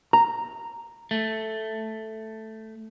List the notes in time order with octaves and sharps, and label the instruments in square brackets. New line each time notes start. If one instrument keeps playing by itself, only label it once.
[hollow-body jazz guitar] A#5
[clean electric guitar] A3